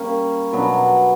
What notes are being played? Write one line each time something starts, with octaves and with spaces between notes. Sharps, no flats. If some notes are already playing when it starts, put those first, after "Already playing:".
Already playing: G3 A#3 C#4
B2 F#3 B3 D4